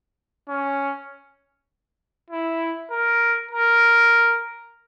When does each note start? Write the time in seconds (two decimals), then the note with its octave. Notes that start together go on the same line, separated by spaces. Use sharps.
0.49 C#4
2.30 E4
2.91 A#4
3.51 A#4